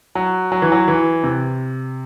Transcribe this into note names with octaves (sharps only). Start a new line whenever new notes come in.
F#3
F#3
E3
F#3
E3
C3